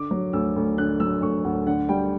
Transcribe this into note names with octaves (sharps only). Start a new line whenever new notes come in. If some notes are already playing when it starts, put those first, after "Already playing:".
Already playing: D3 D6
F#3
D2 E6
D2
D3 F#6
F#3 E6
D2 C#6
D2 F#5
D3 F#5
G3 G5